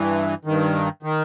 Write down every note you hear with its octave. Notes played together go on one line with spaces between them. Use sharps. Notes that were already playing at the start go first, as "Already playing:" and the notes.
Already playing: G2 E3
G2 D#3
D#3